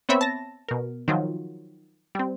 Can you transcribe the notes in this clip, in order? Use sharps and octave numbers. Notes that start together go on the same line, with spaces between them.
B3 C4 C#5 E5 B5
A5 A#6
B2 A#4
D#3 F3 F#3 F4
G3 C4